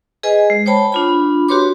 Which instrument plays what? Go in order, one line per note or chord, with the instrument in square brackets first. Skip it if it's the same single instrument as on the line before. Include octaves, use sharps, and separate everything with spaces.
[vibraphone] G#4 B4 D#5 G#5
G#3
C5 C#5 G5 A5 B5
D4 F4 B5
F#4 G4 B4 C#5 C6 D6